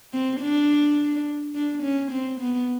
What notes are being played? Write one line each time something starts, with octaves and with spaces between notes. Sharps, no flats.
C4
D4
D4
C#4
C4
B3